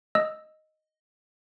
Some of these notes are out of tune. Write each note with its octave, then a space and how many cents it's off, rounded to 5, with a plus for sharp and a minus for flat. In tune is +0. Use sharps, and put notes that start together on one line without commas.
D#5 +0 E6 +0